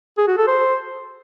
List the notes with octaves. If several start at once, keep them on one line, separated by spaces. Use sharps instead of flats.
G#4
F#4
A4
C5